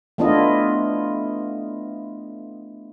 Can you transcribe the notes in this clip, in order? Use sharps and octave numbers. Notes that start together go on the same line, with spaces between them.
A3 B3 D4 E4 F4 D#5